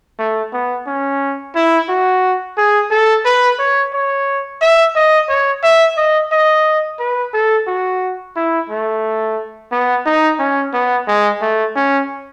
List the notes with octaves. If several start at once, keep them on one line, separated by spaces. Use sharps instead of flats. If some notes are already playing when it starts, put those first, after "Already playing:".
A3
B3
C#4
E4
F#4
G#4
A4
B4
C#5
C#5
E5
D#5
C#5
E5
D#5
D#5
B4
A4
F#4
E4
A3
B3
D#4
C#4
B3
G#3
A3
C#4